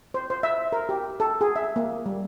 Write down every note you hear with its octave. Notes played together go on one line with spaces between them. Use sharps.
C5
C5
E5
A#4
G4
A4
G#4
E5
A#3
G3